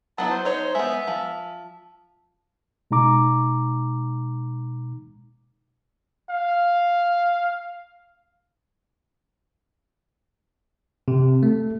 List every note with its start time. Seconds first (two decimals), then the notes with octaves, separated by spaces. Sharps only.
0.18 F#3 B3 E4 A5
0.31 C5
0.45 D#4 C5 C#5
0.75 G#3 B3 E5
1.07 F3
2.91 B2 G#3 D#4 A#5 D6
6.30 F5
11.08 C3
11.43 A3